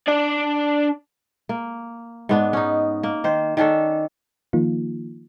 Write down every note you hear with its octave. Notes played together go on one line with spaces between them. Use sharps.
D4 D5
A#3
G#2 B3 D4
C#4 D#4
A#3
D#3 C5
D#3 C#4 D4 A4
D#3 F3 A#3 D#4 F4